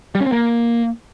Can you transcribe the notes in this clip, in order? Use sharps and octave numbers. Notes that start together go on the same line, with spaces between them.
G3
C#4
C4
A#3